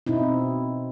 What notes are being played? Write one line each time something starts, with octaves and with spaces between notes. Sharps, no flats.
B2 C4 D#4 E4